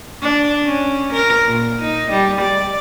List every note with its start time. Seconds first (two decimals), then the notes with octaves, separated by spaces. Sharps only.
0.22 D4
0.66 C#4
1.13 A#4
1.46 A#2
1.81 D#4
2.10 G3
2.41 D5